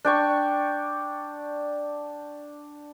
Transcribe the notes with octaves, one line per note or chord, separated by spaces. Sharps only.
D4 G5 C#6